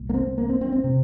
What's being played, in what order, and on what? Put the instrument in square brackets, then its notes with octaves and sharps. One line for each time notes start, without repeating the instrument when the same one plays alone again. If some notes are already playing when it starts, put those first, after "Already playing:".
Already playing: [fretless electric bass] C2 A#2
A#3
C4
A#3
C4
C4
C4
C3